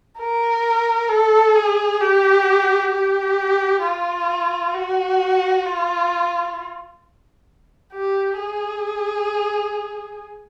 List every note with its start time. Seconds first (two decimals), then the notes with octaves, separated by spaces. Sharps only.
0.19 A#4
1.09 A4
1.56 G#4
2.00 G4
2.92 G4
3.83 F4
4.74 F#4
5.66 F4
7.93 G4
8.39 G#4